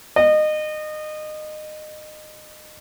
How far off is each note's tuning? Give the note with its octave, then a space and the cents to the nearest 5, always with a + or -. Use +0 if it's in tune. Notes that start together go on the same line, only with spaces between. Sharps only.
D#5 -25